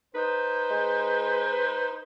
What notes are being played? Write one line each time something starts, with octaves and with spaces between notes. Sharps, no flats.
D#4 B4 C5
G#3